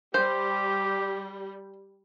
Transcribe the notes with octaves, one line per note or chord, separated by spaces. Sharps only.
G3 G4 C5